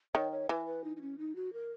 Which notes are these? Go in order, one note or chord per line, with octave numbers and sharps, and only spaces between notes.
D#3 C#5
C#5
E3 B4
B4
D#4
D#4
C#4
D#4
F#4
A#4